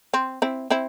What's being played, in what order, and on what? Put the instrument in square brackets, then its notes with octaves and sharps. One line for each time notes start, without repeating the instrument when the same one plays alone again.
[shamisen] C4
C4 E4
C4 E4